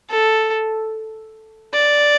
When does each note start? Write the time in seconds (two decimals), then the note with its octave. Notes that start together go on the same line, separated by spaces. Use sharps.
0.10 A4
1.73 D5